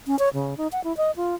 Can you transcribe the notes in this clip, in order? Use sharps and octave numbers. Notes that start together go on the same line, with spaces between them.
C#4
C#5
C#3
D#4
F#5
E4
D#5
F4